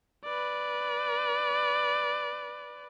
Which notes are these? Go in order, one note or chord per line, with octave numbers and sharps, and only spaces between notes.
B4 D5